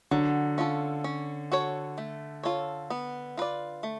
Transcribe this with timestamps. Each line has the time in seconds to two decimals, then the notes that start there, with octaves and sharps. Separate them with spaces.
0.11 D3 F#3
0.58 C#4 F4 A4
1.04 C#4
1.52 F#4 A4 C#5
1.98 A3
2.43 F4 A4 C#5
2.90 B3
3.37 F4 B4 D5
3.83 A3